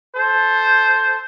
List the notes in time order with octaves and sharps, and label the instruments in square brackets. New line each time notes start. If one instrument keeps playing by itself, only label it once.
[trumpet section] A4 C5